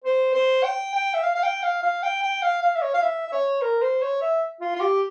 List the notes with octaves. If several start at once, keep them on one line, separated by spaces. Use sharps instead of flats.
C5
C5
G5
G5
E5
F5
F5
G5
F5
F5
G5
G5
F5
F5
E5
C#5
F5
E5
E5
C#5
A#4
C5
C#5
E5
F4
F4
G4